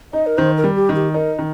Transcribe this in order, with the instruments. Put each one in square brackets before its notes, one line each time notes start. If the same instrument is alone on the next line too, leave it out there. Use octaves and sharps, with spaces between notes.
[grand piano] D#4 [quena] D#5
[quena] A#4
[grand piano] D#3 [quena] C5
[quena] A#4
[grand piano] G3
[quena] G4
[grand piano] D#3
[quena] G4
[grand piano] D#4 [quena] A#4
[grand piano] D#3